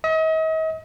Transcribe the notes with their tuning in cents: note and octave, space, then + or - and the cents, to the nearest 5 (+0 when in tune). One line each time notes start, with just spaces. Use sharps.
D#5 +40